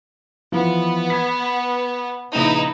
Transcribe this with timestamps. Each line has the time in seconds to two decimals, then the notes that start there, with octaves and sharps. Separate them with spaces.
0.52 E3 F3 B3
1.10 G#6 B6
2.35 A#1 C#3 D#4 E4 B4 E7